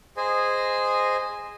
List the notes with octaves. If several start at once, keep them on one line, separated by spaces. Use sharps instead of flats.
G#4 C5 D#5 G#5